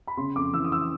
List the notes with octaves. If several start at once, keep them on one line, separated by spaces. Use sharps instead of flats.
B5
C#3 C6
F2 D6
E3 E6
D#6
E6